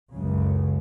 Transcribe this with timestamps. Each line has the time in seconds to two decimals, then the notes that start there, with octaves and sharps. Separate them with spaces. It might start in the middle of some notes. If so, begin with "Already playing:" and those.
0.12 C#2 F#2 C#3